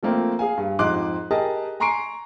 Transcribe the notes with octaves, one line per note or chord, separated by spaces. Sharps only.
F3 A3 A#3 C4
G#4 F5 G#5
G2
F2 G#2 D#5 C6 D6 F#6
G4 G#4 A#4 D#5 A5
G#5 A#5 C6 C#6 C7 D7